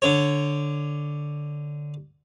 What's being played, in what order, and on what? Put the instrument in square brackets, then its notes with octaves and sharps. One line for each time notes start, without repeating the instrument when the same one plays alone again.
[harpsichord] D3 C#5